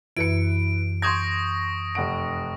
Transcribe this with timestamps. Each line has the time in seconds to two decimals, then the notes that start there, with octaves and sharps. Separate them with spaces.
0.17 F#2 E3 E4 B4 C#7 D7
1.02 C6 C#6 D#6 G6 G#6 A#6
1.95 F1 F#5 D7